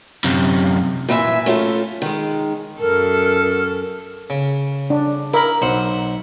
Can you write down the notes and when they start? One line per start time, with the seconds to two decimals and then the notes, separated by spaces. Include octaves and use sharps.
0.24 F#2 C3
1.09 A#2 E3 E5 G#5
1.46 A3 C#4 F4 A4 A#4
2.02 D#3 G#3
2.80 F#2 A4 A#4
4.30 C#3
4.90 D4
5.34 E4 A#4 B5
5.62 B1 C5 F#5